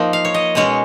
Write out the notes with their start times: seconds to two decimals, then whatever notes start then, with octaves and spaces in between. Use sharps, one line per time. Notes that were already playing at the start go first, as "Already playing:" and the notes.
Already playing: F3 A#3 D#4
0.13 F5
0.25 C#5
0.34 D#5
0.55 B2 G#3 C#4 C#5